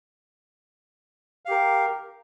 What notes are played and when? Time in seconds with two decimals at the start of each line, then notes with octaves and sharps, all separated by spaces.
1.45 F5
1.48 G4
1.51 A#4